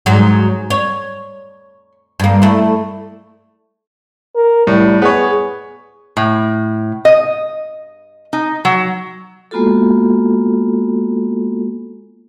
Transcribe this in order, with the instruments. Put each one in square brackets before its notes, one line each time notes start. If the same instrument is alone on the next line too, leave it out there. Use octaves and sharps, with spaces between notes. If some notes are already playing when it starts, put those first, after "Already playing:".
[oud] G#2 F#3
C#5
G2 A#3
A3 E4
[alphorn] A#4
[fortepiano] A2 [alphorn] G3
[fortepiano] B3 C#5 [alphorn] G#4
[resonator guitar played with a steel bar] A2
D#5
D#4
F#3
[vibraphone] G#3 A#3 B3 F4 F#4 A4